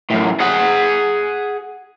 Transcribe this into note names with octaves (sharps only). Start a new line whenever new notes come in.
F#2 A2
G#4 F#5